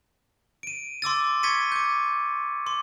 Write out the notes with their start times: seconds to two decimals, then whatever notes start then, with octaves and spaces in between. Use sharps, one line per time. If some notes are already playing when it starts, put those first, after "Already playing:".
0.63 D7 D#7
1.02 C6 D6 E6 A6
1.43 C#6 G#6 A6 B6 C#7 D#7
1.72 D6 G6
2.66 C6 D6